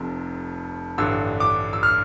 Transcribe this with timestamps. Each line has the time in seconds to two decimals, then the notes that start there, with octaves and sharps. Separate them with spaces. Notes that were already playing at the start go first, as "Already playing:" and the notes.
Already playing: F1 F2 C3
0.98 A1 G2 D3 E6
1.40 D6
1.73 E6
1.83 F6